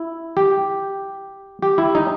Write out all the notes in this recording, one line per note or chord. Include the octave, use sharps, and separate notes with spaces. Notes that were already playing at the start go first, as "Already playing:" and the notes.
Already playing: E4
G4
G4
E4
D#4